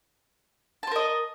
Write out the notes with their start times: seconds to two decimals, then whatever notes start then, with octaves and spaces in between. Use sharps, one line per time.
0.83 A5
0.87 C5
0.91 A#4
0.96 D#5